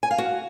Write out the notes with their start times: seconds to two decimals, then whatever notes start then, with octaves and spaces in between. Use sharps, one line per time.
0.03 G#5
0.11 F5
0.18 F#4